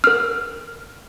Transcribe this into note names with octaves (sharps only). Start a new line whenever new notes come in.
A#4 F6